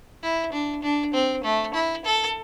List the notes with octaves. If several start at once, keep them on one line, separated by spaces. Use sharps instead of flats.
E4
D4
D4
C4
A3
E4
A4